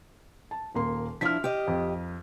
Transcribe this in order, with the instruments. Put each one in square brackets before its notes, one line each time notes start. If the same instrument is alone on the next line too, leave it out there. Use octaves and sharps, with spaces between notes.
[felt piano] A5
D#1 A#3 C6
[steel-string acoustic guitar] F3 D4 E4 [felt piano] F6 B6
[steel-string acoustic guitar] G4 D#5
[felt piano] F2